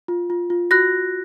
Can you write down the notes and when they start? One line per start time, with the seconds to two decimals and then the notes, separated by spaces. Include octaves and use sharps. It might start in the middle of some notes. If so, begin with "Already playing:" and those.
0.08 F4
0.30 F4
0.50 F4
0.71 F#4 F#6 A#6